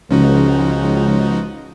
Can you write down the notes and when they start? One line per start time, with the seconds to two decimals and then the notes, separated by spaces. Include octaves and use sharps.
0.11 C#2 F3 C#4 D#4 F#4